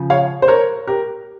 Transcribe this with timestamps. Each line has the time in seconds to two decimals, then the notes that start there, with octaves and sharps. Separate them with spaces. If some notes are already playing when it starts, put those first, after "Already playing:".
Already playing: C#3 F3
0.10 C#5 F5
0.42 C5
0.48 A#4 C#5
0.87 G4 A#4